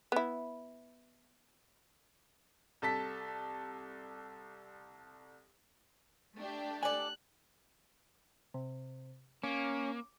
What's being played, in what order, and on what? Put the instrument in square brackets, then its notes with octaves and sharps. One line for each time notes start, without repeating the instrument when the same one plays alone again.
[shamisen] B3 E4
[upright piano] C2 A4 A5 B6
[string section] A3 D4 G4
[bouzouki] A4 D5 [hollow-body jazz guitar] G#5 [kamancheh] F#6
[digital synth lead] C3
[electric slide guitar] A#3 [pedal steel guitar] C#4 [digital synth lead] D6